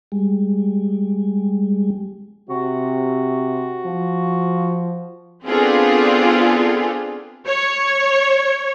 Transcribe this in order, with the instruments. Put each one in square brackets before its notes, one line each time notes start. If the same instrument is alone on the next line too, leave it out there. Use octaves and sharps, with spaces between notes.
[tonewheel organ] G3 G#3
[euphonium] C3 [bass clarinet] F#4
[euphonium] F3
[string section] B3 C4 D4 F4 G#4 A4
[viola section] C#5